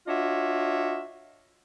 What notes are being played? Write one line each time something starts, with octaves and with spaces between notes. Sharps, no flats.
D4 F4 F#4 C#5 D#5 E5